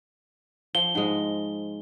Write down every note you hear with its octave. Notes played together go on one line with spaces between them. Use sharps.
F3 G7
G#2 G#3